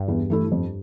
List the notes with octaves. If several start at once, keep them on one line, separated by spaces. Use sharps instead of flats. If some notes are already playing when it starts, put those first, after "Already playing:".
Already playing: G2
E2
E3 A3 E4
F2